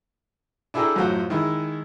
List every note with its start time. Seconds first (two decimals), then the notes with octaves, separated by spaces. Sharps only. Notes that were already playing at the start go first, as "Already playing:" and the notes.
0.74 D4 E4 G#4 A4 G5 A#5
0.96 F#2 A2 F#3 F4 C5 F#5
1.30 D#3 G#3 E4